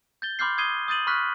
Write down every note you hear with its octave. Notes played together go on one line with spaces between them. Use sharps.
G6 A6 G7
B5 C6 D6 F6 G6 C7
D#6 G#6 C7 D#7 G7
D#6 G6 A6 D#7 F#7
B5 C#6 F6 F#6 B6